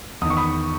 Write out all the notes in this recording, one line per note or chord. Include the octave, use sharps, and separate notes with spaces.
E2 D#3 C#6 D#6
B5 D#6